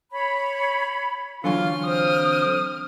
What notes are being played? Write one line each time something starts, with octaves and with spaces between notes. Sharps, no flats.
C#5 B5
D3 E3 F#3 F4 F6
C4 D#6